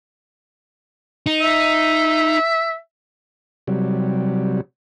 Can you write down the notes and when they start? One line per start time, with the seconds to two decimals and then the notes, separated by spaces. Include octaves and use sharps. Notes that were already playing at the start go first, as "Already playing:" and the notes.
1.26 D#4
1.41 E5
3.67 C3 F#3 G3